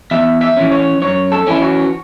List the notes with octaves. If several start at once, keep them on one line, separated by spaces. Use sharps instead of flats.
E2 E5
E5
E3 C#4
C#5
F#2 C#5
A4
E3 C#4 E4
F#4